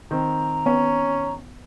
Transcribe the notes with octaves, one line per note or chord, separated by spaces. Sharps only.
D#3 C4 A#5
B3 C#4